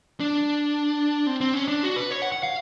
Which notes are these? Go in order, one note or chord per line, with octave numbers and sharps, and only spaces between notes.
D4
C4
C4
C#4
D4
F#4
B4
C#5
F#5
F#5
F5